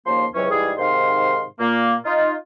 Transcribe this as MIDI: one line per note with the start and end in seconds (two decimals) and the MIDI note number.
0.06 0.26 39
0.06 0.26 49
0.06 0.26 53
0.06 0.26 58
0.06 0.26 84
0.35 0.47 37
0.35 0.47 48
0.35 0.47 52
0.35 0.47 54
0.35 0.47 61
0.35 0.47 73
0.50 0.72 44
0.50 0.72 52
0.50 0.72 55
0.50 0.72 68
0.78 1.44 44
0.78 1.44 48
0.78 1.44 51
0.78 1.44 77
0.78 1.44 84
1.60 1.95 46
1.60 1.95 58
2.05 2.33 63
2.05 2.33 65